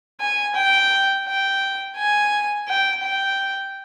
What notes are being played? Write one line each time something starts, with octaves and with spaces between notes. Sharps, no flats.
G#5
G5
G5
G#5
G5
G5